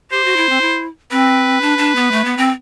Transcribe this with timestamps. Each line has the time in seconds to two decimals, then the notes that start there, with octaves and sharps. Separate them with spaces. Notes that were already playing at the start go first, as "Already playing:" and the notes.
0.11 G4 C5
0.25 F#4
0.37 E4
0.49 C4
0.61 E4
1.11 C4 B4
1.61 D4
1.78 D4
1.96 B3
2.12 A3
2.25 B3
2.37 C4